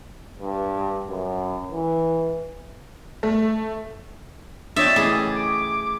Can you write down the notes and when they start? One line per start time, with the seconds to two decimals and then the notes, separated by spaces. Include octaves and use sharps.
0.39 G2
1.10 F#2
1.71 E3
3.23 A3
4.76 F3 D4 G4 C#5 D#5 E5 A6
4.96 A2 C#3 E3 G#4
5.34 D6